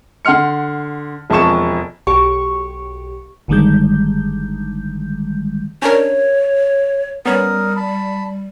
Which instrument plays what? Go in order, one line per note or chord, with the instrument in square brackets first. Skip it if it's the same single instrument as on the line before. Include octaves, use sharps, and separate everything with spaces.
[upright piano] D3 F#5 C6 F6 C#7
E1 F2 G#4 A5 C#6 E7
[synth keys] B1 G4 [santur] C#6
[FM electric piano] G1 D3 D#3 G3 G#3 G6
[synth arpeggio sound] C#4 D4 A#4 [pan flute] C#5
[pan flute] G3 [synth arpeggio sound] B3 C#4 [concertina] A#4 D#6
[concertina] A5 B5